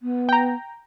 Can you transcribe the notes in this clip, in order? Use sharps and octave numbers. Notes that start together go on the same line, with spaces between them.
B3
G5 A#5